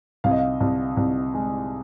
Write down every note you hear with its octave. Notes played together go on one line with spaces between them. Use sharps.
C2 F5
D#5
F5
C2
C2
G#3